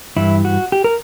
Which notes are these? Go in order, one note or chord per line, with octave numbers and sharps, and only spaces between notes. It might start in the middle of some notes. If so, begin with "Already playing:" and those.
G2 E3 E4
F#4
G4
A#4